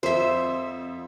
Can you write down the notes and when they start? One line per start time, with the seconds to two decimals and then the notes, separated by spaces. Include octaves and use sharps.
0.03 F2 C5 E5